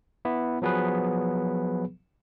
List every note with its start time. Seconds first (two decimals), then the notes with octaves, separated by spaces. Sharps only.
0.25 B3 E4
0.62 F3 F#3 B3 G#4 B4